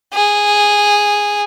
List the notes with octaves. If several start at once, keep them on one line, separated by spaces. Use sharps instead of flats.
G#4